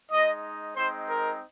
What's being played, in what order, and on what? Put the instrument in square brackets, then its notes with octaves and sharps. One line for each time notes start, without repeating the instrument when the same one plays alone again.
[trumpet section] G#3 D#4 D#5
G#3 C4 D#4 C5
A#4